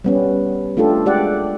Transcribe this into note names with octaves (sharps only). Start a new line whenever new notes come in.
G3 B3 C#4
A3 D4 F4 G4 A4
G#3 G4 D5 F#5